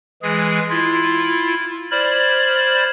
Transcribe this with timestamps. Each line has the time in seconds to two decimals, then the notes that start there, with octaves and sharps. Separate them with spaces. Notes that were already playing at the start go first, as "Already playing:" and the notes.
0.22 E3 G#3 G#4
0.70 E4 F4
1.91 C5 D5 B5 F6 G#6